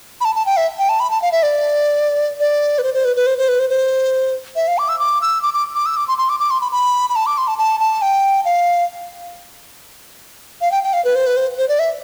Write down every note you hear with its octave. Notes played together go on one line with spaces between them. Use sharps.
B5
A5
A5
G5
E5
G5
A5
B5
A5
F5
E5
D5
D5
B4
C5
C5
B4
B4
C5
C5
B4
C5
C5
E5
F5
D6
E6
D6
E6
D6
D6
D6
E6
D6
C6
C6
D6
D6
C6
B5
B5
B5
A5
D6
C6
A5
A5
A5
G5
F5
F5
G5
G5
F5
B4
C5
B4
C5
C5
D5
E5